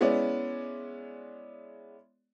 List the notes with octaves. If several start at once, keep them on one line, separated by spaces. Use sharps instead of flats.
G#3 B3 C#4 E4 D5